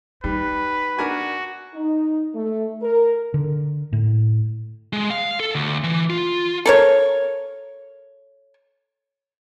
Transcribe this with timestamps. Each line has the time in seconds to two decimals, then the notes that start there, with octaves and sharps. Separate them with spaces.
0.24 G3 D#4 F4 B4
0.99 D4 F#4 A#4 G#5
1.75 D#4
2.35 A3
2.83 A#4
3.34 D3
3.93 A2
4.93 G#3
5.10 F5
5.40 A4
5.55 D2
5.84 E3
6.10 F4
6.66 A4 A#4 C#5